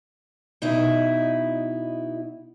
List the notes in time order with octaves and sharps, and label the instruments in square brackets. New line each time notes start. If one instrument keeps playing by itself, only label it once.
[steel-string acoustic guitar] B2 D#4 E4